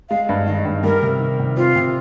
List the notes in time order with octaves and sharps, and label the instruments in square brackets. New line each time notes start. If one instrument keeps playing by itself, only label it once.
[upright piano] G#3 [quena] F5
[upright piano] G2
[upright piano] D#3 [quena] D#5
[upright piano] G2
[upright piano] G3 [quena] A#4
[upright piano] C3
D#3
C3
[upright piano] C4 [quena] F4
[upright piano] C3